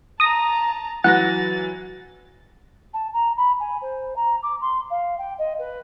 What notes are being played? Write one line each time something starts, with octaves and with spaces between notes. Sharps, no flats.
A5 A#5 D#6 A#6
E3 F#3 F#5 A6 A#6
A5
A#5
B5
G#5
C5
A#5
D6
C6
F5
G5
D#5
B4